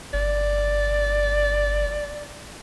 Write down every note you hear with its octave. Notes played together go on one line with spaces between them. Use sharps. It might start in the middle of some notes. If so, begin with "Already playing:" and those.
G1 D5